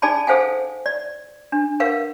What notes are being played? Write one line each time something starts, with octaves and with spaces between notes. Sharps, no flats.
D#4 G#4 D5 G#5 A5 B5
G#4 A4 C5 F5 F#5 G#5
D5
D4
A#4 B4 F5 F#5